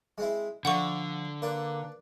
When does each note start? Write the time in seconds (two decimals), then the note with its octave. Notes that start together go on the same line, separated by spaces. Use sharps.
0.18 G#3 C4 E4
0.65 D3 F3 A4 D5 F#5 C#6
1.42 A#3 D4 B4 D5